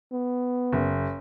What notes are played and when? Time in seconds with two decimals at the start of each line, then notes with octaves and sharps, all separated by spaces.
0.12 B3
0.72 F#1